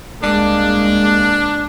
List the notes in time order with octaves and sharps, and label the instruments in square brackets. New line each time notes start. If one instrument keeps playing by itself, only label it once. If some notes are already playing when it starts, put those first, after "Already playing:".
[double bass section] C2 G#3 A#3 [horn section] D4